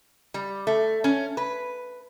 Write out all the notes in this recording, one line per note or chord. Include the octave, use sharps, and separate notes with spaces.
G3
A3
C#4
B4